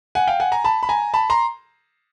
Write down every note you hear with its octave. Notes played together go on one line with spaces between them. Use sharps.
F#5 G#5
F5 G5
F#5 G#5
G#5 A#5
A5 B5
B5
G#5 A#5
A5 B5
A#5 C6